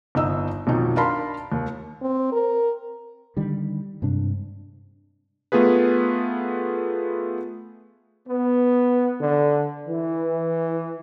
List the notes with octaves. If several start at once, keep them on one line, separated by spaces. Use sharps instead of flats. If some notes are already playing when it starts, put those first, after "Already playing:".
G1 D#4 D#5 E6
B1 F2 D#3 D#4
D4 A#4 F5 A5 B5 C6
D#2
C4
A#4
D3 D#3 G3
G2 C3 G#3 D4
A3 B3 F4 G#4 B4
B3
D3
E3